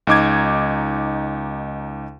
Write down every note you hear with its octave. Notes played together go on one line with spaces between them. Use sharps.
C#2 D#4 D6 G#6